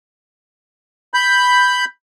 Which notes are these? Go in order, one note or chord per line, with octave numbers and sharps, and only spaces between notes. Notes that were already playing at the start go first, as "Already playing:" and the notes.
B5 G6